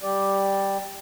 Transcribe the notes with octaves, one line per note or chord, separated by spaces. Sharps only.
G3 G4 D5